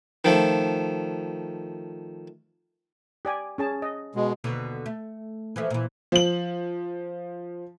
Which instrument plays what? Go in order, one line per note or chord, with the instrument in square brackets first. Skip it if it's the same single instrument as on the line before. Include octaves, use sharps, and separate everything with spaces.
[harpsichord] D#3 F3 A3
[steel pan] G4 D5 G#5
C#4 G#4 A5
D#5
[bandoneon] B2 G#3
[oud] D#2 B2 D3
A3
E3 F3 A3
A#2 E3
[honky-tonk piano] F3 F#7